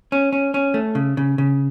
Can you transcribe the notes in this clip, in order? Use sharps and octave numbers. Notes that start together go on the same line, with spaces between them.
C#4
C#4
C#4
A3
C#3
C#3
C#3